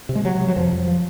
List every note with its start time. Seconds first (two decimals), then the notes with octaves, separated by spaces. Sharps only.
0.09 C3
0.15 G#3
0.24 C3 F#3
0.41 C3
0.48 F#3
0.56 F2 F3
0.72 F2
0.79 F#3
0.88 F3